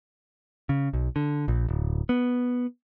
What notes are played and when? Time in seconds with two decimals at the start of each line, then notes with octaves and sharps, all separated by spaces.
0.69 C#3
0.93 B1
1.16 D3
1.48 A#1
1.69 D1
2.09 B3